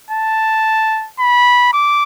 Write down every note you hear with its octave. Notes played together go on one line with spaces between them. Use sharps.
A5
B5
D6